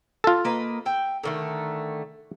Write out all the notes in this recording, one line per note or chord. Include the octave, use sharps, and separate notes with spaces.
F4 A4
A#3 B4 D#5
E5 G5
D3 D#3 A3